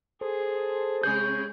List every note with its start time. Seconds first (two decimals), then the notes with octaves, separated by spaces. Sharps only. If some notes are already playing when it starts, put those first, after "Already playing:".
0.21 G#4 A4 C5
1.03 C3 G#3 C#4 G#4 G6